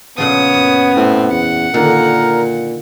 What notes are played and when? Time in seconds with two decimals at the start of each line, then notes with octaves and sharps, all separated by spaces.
0.18 A#2 C#3 F3 B3 C#5 D#6
0.54 F#2
0.96 A2 C4
1.31 E2 F#5
1.74 A#2 D3 D#3 A#3 A#4